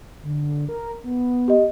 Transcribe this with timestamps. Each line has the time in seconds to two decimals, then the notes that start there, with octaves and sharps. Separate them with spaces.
0.23 D3
0.69 A#4
1.04 B3
1.48 G4 D#5